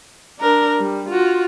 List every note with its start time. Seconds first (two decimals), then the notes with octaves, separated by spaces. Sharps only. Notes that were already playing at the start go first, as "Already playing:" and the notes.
0.39 D4 A#4
0.79 G3
1.09 F4 F#4